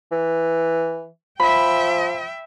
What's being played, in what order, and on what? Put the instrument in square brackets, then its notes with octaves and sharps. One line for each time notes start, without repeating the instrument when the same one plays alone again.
[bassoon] E3
[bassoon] F3 [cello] E5 G5 [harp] B5